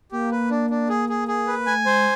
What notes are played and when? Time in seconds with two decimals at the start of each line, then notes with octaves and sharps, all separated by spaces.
0.11 A#3 G4
0.31 B4
0.50 D4
0.70 D4
0.89 G#4
1.09 G#4
1.28 G#4
1.47 B4
1.67 A3 G#5
1.86 G#3 C5